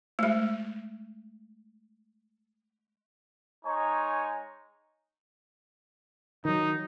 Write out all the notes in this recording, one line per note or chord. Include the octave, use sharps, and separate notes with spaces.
G#3 A3
G#3 D#4 C#5 G#5 A#5 C#6
D#3 F#3 D#4